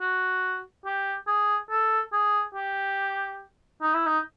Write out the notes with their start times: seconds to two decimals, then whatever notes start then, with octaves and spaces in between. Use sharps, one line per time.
0.01 F#4
0.86 G4
1.27 G#4
1.71 A4
2.13 G#4
2.55 G4
3.82 D#4
3.94 E4
4.06 D#4